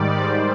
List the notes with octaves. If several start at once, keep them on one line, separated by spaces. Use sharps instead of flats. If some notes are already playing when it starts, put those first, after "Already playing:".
Already playing: G#2 D#3 G3 D5
C5